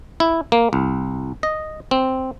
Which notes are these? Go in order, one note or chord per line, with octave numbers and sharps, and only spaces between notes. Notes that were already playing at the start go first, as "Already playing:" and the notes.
E4
A#3
C2
D#5
C4